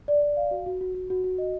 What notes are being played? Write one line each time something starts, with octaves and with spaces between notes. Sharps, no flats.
D5
D5
F5
F#4
F#4
F#4
F#4
F#4
F#4
D#5